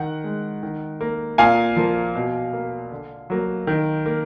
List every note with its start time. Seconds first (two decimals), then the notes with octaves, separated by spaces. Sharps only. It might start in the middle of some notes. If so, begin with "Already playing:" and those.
Already playing: D#3 F#5
0.24 G#3
0.63 D#3
1.01 A#3
1.38 A#2 F5 G#5
1.77 F3 A#3
2.15 B2
2.53 A#3
2.92 D3
3.30 F#3 A#3
3.67 D#3
4.06 A#3